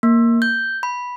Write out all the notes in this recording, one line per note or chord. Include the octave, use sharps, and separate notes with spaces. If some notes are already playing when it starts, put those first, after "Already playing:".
A#3
G6
B5